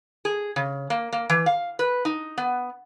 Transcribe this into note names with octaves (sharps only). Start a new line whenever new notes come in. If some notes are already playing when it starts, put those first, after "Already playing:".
G#4
C#3
A#3
A#3
E3
F5
B4
D#4
B3